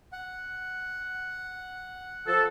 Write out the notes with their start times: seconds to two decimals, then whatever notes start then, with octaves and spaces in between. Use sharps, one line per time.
0.13 F#5
2.27 F3 A4